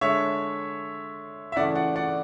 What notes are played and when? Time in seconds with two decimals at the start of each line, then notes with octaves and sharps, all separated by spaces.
0.01 D3 G#3 C#5 E5
1.52 E5
1.56 C#3 E3 A3 D5 F#5
1.75 D5 F#5
1.96 D5 F#5